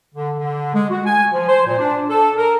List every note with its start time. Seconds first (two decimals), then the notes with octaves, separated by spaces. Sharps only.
0.15 D3
0.37 D3
0.74 G#3
0.90 F#4
1.05 G#5
1.32 F3
1.48 C5
1.66 A#2
1.78 D4
2.09 A4
2.37 A#4